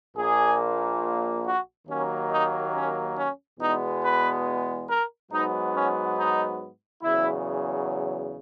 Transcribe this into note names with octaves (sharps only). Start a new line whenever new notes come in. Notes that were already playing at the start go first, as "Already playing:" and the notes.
A#1 A#2 A#3 G#4
F#4
D#2 D#3 F#3 A#3 C#4
D#4
C#4
C#4
E2 B2 G#3 B3 D#4
B4
A#4
G#2 F#3 B3 D#4
C#4
D#4
E2 C#3 F#3 E4